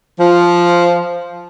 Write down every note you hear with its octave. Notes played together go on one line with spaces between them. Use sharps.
F3